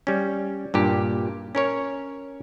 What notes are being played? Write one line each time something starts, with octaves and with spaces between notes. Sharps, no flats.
G3 C#4
G2 A#2 G4
C#4 A#4 C#5